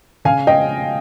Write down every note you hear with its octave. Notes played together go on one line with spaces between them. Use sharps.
C#3 F5 G#5
D#5 G5